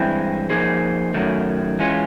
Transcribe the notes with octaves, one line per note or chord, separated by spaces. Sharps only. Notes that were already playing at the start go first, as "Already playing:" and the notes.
Already playing: G2 E3 G#3 C4 E4
F3 A#3 D#4 G#4 C5
F#2 D#3 F#3 A3
E3 G#3 C#4 F4